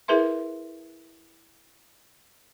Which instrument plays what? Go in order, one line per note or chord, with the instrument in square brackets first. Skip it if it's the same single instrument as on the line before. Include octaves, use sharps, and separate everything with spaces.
[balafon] E4 G#4 A#4 B4 E5 C6